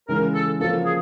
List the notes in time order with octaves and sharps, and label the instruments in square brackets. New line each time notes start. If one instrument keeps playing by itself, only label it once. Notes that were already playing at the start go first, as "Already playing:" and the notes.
[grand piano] C#3 E3 G#3 C#4 [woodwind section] A#4
[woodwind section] A4
[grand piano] C#3 F3 A#3 C#4 F#4 [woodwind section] A4
[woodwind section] G#4